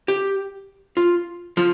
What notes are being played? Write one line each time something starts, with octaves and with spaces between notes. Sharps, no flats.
G4
F4
F3 F4